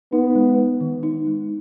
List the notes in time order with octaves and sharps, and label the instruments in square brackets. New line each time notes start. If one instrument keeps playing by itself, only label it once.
[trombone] B3 [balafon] D#4
[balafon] G#3
B3
D#3
D#4
G#3